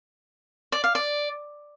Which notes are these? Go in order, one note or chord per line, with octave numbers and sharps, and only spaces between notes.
D5
F5
D5